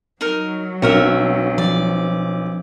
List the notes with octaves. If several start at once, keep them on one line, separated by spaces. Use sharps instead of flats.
F#3 D#4 A#4
B1 C4 D4 F#4 A#4 E5
F3 D5